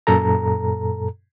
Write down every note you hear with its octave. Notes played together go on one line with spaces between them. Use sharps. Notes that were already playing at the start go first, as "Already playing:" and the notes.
F#2 A#2 A4 A#5